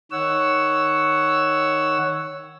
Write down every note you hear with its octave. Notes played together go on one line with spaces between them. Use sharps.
D#3 C#5 F#5 E6